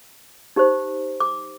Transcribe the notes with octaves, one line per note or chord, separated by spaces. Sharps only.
D#4 G4 C5
D6